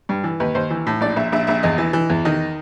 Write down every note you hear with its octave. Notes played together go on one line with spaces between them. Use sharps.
G2
E3
D#2 B4
D#2 C5
E3
A2
A#1 D5
A#1 E5
A#1 E5
A#1 E5
E2 D#5
E3
E3
E2
D#3 D#5